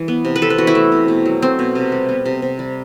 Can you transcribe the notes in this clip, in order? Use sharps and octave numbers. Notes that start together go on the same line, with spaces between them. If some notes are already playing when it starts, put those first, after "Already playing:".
Already playing: E3 G3
B3
C3
B4
C3 A4
B4
E3 F#4
E4
A3
C3
B2
F#3
A3 C4
B2
C3
G3
B3
C3
C3
G3